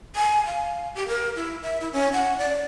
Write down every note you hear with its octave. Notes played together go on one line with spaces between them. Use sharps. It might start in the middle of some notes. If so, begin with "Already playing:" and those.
G#5
F5
G4
A#4
E4
E5
E4
C#4
F#5
D5